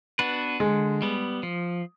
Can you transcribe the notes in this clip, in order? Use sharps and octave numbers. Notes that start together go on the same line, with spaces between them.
B3 D4 F#4 B4
D3 G#3
G3 B3
F3